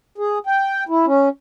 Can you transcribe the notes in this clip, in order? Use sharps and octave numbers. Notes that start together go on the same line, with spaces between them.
G#4
G5
E4
C#4